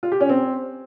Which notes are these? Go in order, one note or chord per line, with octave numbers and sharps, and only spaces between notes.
F4
G4
C#4
C4